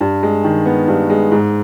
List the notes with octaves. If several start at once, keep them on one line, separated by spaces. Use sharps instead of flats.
G2
G#3
D#3
B3
G2
G#3
G#2